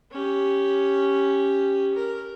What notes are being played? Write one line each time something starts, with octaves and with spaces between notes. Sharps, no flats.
C#4 G4
A#4